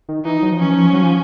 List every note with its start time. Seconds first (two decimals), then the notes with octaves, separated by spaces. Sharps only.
0.09 D#3
0.25 E3 D#4
0.42 F#3
0.52 F3
0.60 E3 C#4
0.71 F3
0.93 F#3
1.03 F3